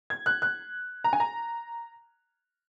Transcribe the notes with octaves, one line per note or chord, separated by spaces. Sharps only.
G#6
F#6
F#6
A#5
G#5
A#5